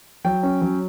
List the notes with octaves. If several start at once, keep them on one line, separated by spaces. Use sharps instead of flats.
F#3 G5
C#4
F#3